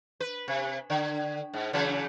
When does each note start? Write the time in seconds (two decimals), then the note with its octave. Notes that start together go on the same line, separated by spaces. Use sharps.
0.20 B4
0.48 C3
0.90 D3
1.54 G#2
1.73 C#3 E3 F#3